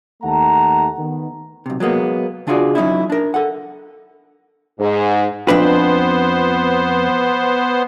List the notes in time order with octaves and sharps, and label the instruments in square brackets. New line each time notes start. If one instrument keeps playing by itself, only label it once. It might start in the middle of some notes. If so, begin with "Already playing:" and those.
[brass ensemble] D#2 A3 F#5 A5 A#5
D#3 B3
[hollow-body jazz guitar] B1 C3
F#3 G#3 A#3 B3
C#3 D4 F4 F#4 G#4 D5
F#3 C#4 D#4 E4
D4 A#4
A4 F#5
[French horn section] G#2
[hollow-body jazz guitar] F2 D4 B4 [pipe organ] B3 C5